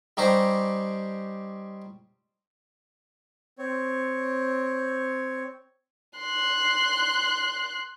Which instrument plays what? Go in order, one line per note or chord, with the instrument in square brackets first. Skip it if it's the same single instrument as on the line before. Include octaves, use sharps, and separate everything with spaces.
[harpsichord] G3 C#4 D#4 G4 C5 D#6
[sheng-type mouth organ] C4 C#5
[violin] C6 F#6